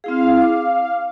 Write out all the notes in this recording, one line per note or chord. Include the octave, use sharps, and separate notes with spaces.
C4 E4 G#4 F5
D6